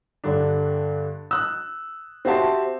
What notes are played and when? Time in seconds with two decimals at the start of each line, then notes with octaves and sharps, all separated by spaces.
0.24 G2 D3 D4
1.31 E6 F#6
2.25 C4 F#4 G4 E5 A5 C6